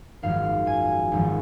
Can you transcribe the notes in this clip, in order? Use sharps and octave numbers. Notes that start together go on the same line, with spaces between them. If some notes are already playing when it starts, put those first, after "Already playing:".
G#1 F#2 F3 F5
G#5
G#1 F#2 F3